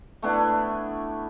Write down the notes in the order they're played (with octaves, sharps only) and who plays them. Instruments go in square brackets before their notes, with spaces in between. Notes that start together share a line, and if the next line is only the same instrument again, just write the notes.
[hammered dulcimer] A3 B3 D4 E4